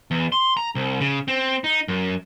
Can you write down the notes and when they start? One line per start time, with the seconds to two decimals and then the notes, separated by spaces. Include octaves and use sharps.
0.11 E2
0.32 C6
0.57 A#5
0.75 C2
1.00 C#3
1.28 C4
1.64 D#4
1.88 F#2